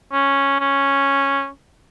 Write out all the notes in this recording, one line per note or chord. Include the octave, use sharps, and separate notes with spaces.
C#4
C#4